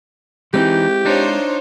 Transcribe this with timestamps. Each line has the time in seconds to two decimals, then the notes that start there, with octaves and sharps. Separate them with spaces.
0.54 E3 G#3 C4 D#4 E4 G4
1.05 D4 D#4 F4 C5 C#5